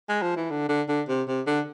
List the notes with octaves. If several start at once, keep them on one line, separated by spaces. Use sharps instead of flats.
G#3
F3
E3
D3
D3
D3
C3
C3
D3